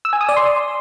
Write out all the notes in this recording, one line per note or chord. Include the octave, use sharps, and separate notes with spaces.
E6
G#5
D#6
D5
C6